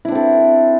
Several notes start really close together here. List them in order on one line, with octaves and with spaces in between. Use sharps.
E4 D4 C4 A4